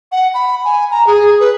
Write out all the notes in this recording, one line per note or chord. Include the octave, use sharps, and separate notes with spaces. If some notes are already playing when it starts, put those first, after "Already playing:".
F#5
B5
G#5
A#5
G#4
B4